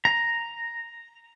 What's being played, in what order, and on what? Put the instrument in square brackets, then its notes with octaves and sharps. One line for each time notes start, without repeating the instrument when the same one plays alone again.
[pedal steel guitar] A#5